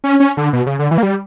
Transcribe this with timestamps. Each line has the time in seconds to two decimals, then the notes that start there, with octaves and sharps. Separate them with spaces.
0.04 C#4
0.20 C#4
0.37 D3
0.53 B2
0.67 C#3
0.79 D3
0.91 E3
0.98 A#3
1.03 G3